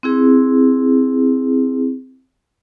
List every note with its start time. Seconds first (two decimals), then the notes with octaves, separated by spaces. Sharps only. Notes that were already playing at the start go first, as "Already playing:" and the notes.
0.03 C4 E4 G#4